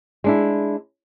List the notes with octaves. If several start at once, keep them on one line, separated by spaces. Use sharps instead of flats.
G#3 D4 E4